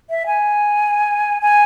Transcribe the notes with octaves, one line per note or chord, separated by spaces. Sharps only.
E5
G#5
G#5